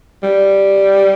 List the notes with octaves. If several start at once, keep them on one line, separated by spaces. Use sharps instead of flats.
G3